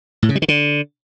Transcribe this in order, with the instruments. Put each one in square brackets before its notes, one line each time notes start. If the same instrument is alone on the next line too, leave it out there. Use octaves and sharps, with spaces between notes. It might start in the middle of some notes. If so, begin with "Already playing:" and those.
[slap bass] A2
C#3
G3
D#3
D3